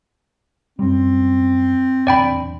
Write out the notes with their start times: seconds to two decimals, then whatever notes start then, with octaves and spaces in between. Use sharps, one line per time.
0.79 F#2 G3 C4
2.07 D1 E2 D4 D5 G5 B5